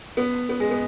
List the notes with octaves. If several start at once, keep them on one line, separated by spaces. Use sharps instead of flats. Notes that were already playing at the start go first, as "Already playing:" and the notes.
B3
B3
G#3
B3